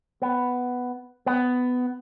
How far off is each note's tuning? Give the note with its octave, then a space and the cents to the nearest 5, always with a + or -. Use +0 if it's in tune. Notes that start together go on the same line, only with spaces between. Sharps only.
B3 +5
B3 +15